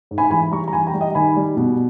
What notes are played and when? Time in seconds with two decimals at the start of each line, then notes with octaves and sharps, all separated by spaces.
0.11 G#2
0.18 G#5 B5
0.31 E3 G#5 B5
0.52 G3 A#5 C#6
0.68 A#5
0.73 E3 G#5 B5
0.87 G5 A#5
0.94 G3
1.01 D#5 G5
1.15 D#3 G#5 B5
1.36 G3
1.57 B2